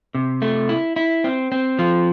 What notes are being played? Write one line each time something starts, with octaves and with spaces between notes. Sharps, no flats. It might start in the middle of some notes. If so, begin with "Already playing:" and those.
C3
A3
E4
E4
C4
C4
F3